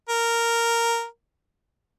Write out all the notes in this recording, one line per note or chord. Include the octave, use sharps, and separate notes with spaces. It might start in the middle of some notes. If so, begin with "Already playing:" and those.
A#4